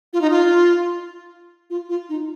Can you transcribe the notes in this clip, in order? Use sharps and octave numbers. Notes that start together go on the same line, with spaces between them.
F4
D#4
F4
F4
F4
D#4